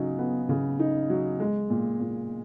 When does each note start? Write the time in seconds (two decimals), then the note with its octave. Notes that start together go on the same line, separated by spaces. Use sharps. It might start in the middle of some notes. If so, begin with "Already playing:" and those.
Already playing: C#3 F#3 D#4
0.19 B3
0.49 C#3
0.79 D#4
1.10 F#3
1.40 G#3
1.70 A#2
2.00 A#2